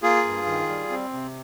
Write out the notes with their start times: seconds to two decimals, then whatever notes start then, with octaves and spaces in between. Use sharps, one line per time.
0.03 A#3 F4 G#4
0.25 G2
0.47 D#3
0.69 G3
0.90 C4
1.13 C3